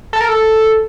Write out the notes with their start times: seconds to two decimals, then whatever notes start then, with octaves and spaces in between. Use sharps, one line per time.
0.13 A4
0.21 A#4
0.28 A4